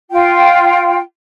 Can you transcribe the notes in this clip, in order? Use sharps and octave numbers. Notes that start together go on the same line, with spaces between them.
F4 G5